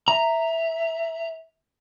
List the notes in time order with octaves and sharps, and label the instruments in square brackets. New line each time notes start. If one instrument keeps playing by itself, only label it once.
[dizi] E5 [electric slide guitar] A#5